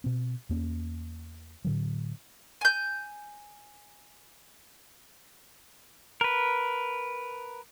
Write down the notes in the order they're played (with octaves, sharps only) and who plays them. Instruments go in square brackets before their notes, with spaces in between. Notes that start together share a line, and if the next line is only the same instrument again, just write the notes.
[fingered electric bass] B2 C4
E2 A#3 C#4
A2 D3 F#3
[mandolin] G#5 G6
[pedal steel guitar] A#4 B4